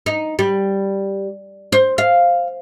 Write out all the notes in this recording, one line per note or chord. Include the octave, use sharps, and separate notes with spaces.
D#4
G3
C5
F5